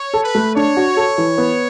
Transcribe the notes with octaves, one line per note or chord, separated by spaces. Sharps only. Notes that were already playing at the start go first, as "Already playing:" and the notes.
Already playing: C#5
A4
B4
A3
D4 C#5
F#4
A4
E3
B3